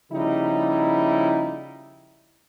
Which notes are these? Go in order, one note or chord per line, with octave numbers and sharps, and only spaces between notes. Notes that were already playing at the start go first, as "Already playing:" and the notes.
C#3 F3 G3 A#3 D#4 E4